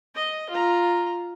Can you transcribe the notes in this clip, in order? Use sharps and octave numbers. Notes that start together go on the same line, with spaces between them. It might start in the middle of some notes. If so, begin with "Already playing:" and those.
D#5
F4 A#5